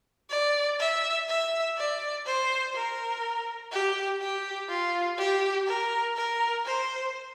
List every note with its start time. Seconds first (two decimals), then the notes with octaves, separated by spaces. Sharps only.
0.30 D5
0.79 E5
1.28 E5
1.77 D5
2.26 C5
2.75 A#4
3.71 G4
4.21 G4
4.69 F4
5.18 G4
5.67 A#4
6.16 A#4
6.65 C5